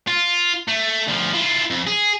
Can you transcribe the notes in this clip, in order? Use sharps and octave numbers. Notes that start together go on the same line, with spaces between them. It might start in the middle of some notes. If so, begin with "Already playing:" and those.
F4
A3
D2 F3
E4 F4
F2
G#4